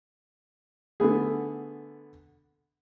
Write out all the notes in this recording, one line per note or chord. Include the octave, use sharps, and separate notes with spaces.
D3 A3 B3 G#4